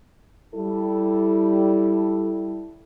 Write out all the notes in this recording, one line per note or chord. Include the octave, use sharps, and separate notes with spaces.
G3 E4 A4